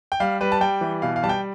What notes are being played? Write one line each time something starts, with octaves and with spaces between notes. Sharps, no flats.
G5
G3 F5
G3 B4
A5
G3 G5
E3
B2 F5
F5
G3 A5
G5